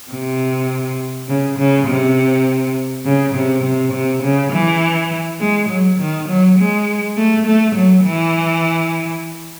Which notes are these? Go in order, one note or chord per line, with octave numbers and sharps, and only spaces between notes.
C3
C#3
C#3
C3
C#3
C3
C3
C3
C#3
E3
G#3
F#3
D#3
F#3
G#3
A3
A3
F#3
E3